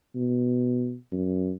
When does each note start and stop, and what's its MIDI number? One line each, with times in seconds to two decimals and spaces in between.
0.15 0.94 47
1.12 1.52 42